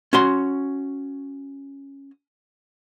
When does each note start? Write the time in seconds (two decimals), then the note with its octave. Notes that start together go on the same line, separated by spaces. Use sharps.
0.13 C#4 F#4 C6